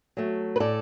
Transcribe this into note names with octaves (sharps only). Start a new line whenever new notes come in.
F#3 A3
B4
A2 A4 D5